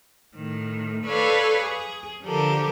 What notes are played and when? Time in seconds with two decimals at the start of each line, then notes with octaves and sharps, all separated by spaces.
0.36 A2 D#3
1.06 A4 B4 C#5 D5 F5
1.61 G#4
2.23 D3 F3 G4 A4 A#4